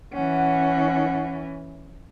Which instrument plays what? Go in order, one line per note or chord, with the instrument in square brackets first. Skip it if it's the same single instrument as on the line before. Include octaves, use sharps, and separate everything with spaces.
[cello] E3 C#4 [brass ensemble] F#5